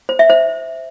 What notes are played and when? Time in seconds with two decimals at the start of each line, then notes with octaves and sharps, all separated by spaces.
0.09 C5
0.19 E5
0.30 C5